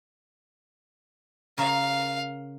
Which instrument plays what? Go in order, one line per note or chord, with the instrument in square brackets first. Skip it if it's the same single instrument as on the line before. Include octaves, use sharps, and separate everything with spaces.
[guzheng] C#3 A#4 [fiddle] F5